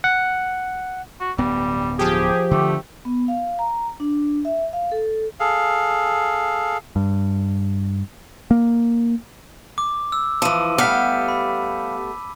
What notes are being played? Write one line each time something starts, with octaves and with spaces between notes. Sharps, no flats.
F#5
F#4
D1 G2 G3 B3
F3 G4 G#4
D3 A3
B3
F5
A#5
D4
E5
F5
A4
G#4 A4 F5
G2
A#3
D6
E6
E3 F3 A5 D#7
G3 A3 B3 G4 F5 D6 B6
B5